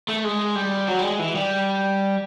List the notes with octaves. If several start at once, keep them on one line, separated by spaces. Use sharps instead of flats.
A3
G#3
G3
F#3
G3
G#3
E3
G3